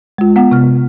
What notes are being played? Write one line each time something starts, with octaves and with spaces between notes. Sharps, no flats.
G#3 F4
B3 F#5
C3 F6